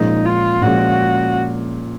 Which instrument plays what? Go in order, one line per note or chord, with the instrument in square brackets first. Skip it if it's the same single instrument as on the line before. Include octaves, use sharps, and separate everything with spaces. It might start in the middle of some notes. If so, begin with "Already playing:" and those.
Already playing: [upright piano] A#2 F3 G#3 C#4 [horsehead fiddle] D#4
[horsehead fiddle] F4
[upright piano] A#2 F3 G#3 C#4 [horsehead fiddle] F#4